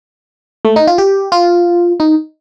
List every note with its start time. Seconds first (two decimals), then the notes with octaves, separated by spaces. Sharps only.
0.65 A3
0.76 D#4
0.87 F4
0.98 G4
1.32 F4
2.00 D#4